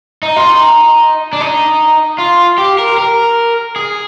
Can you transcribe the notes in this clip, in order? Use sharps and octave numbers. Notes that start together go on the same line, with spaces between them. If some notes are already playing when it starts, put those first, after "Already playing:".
D#4
F4
D#4
D4
D#4
F4
G4
A#4
A#4
G#4